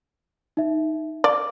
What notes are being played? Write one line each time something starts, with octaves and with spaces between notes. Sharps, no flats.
D#4 E5
D5 F5 D6